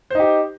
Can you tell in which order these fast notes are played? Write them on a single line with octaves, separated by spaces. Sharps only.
C5 D#4 G4